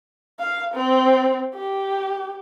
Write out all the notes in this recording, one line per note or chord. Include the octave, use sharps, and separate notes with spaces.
F5
C4
G4